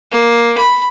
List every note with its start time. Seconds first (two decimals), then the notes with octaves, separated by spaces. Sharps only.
0.11 A#3
0.58 B5